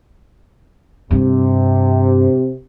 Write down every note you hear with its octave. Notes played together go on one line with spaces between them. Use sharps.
G2 C3